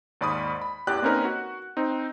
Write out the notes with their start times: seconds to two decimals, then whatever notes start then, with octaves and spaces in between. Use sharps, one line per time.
0.21 D#2 G#2 D5 B5 C#6 D#6
0.61 B5
0.87 A1 E2 G4 D5 G5 F#6
1.02 A#3 C4 C#4 D#4 A#4 B4
1.25 F#4
1.77 C4 D#4